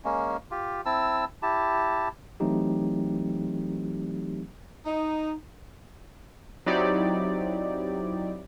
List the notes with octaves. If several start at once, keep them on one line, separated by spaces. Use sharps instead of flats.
G#3 A#3 C#4
F4 G4
C4 E4 A5 E6
E4 G4 A5
E3 F#3 A3 C4 D#4 G4
D#4
F#3 C4 D#4 E4 G4 D5